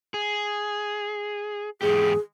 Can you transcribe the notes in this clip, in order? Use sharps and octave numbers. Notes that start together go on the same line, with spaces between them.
G#4
E2 G#2 G4 G#4